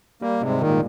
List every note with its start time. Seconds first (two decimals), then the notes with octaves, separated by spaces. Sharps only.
0.22 G3 A#3
0.41 G#2 C3 G#3
0.61 A#2 D#3 A#3